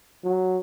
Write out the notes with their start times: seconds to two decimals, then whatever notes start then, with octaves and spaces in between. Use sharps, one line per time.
0.24 F#3